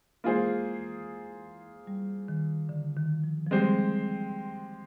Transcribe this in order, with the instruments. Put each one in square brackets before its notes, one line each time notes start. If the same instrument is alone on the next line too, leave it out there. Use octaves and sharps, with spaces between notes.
[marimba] G#3 [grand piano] A#3 F4 G#4 C5
[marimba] G3
D#3
D3
D#3
F3
F3
[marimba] G3 [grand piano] G#3 C4 G4 C5